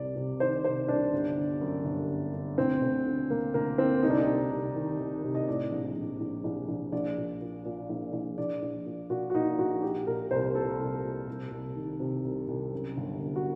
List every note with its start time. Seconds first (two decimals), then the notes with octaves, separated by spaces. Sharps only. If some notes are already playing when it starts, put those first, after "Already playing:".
Already playing: C2 C3 D5
0.16 C3
0.40 D#3 C5
0.64 C3 C5
0.88 C2 D4
1.13 G1
1.37 D3
1.61 F#2
1.85 G1
2.10 D3
2.34 D3
2.58 D2 C4
2.82 D2
3.06 D3
3.30 D2 A#3
3.54 D2 A#3
3.78 D3 C4
4.03 C2 D#4
4.10 D4
4.17 D#4
4.27 C2
4.51 C3
4.75 D#3
4.99 D#3
5.23 C3
5.35 D#5
5.48 A2 D5
5.72 A#1
5.96 A#1
6.20 A#1
6.44 A#1
6.68 A#1
6.92 A#1 D5
7.17 A#2
7.41 A#2
7.65 A#2
7.89 A#1
8.13 A#1
8.38 A#1 D5
8.62 A#1
8.86 A#2
9.10 A#2 F#4
9.30 F#4
9.34 A#2 D#4
9.59 A#1 F#4
9.82 A#2 G4
10.07 A#2 A#4
10.31 C2 C5
10.55 A#2 A4
10.79 C2
11.04 A#2
11.28 C2
11.52 C2
11.76 D#3
12.00 C3
12.24 C2
12.48 C2
12.72 F#2
12.97 G1
13.21 G1
13.35 F#4